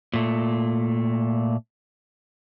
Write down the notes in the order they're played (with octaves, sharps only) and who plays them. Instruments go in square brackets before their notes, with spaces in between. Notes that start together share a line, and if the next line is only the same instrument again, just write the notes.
[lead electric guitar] A#2 A3